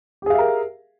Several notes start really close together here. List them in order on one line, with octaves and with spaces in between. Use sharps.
G4 G#4 F5 E5 A#4